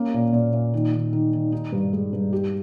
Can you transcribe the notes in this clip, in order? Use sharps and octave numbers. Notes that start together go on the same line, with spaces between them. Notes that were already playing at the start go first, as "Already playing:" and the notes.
Already playing: A#3 C#4
A#2
A#2
A#2
D#3
D#3
D#3
D#3
D#4
G2
G#3
G2
G4